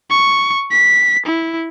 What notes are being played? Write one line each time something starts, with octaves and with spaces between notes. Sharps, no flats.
C#6
B6
E4